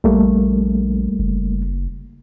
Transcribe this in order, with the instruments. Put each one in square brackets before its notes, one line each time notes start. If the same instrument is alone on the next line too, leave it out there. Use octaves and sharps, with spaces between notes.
[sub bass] A#1 [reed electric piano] G3 A3 A#3
[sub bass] F#1